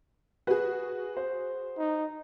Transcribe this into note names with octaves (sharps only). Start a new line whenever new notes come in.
F#4 G#4 B4
C5
D#4